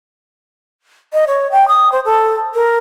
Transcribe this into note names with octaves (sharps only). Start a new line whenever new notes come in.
D#5
C#5
G5
D#6
C5
A4
A#4